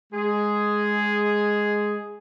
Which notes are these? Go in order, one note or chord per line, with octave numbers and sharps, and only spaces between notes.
G#3 G#4